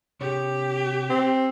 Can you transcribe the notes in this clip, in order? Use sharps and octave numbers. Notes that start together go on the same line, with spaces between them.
C3 G4 C#5
C4